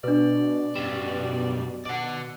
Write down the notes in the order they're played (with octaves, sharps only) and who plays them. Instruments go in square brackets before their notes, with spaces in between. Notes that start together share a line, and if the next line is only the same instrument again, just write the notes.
[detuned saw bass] B2 [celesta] D4 B4 [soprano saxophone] D5
[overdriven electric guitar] F#2 G3 [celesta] E7
[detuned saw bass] B2 [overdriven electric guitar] D5 F#5